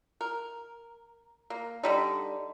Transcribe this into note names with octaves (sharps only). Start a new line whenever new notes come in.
A#4
A#3
D3 G3 D#4